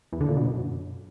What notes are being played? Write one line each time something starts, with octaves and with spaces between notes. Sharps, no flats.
E2
D3
A#2
B2
F#2